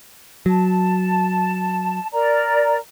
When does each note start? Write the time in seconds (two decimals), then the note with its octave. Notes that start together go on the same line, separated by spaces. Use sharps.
0.46 F#3 A5
2.13 A#4 D5 A#5